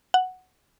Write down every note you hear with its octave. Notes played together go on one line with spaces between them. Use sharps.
F#5